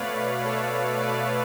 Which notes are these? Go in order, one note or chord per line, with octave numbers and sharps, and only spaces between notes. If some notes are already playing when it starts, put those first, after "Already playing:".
Already playing: B2 A3 B4 C#5 D5 F5
A4 C#5
B4 D5